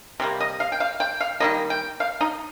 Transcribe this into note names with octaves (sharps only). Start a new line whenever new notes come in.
C3 G3 A#3
D#5
F5
G5
F5
G5
F5
D#3 G3 A#3 D#5
G5
F5
D#4